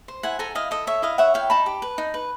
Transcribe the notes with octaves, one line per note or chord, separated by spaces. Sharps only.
C5
E4 F#5 G#5
A4 G#5 A#5
E4 D#5 F5
A4 D#5
C#5 E5
E4 D#5 F5
C#5 E5 F#5
E4 F5 G5
D#4 A5 B5
G4
B4
D#4
B4